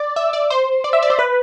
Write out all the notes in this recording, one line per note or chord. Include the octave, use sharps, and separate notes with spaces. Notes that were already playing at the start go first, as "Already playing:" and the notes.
Already playing: D5
E5
D5
C5
D5
E5
D5
C5
B4